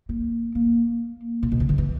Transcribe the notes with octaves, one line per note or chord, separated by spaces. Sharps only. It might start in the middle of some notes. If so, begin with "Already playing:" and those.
A#3
A#3
A#2
B2
C#3
D#3
E3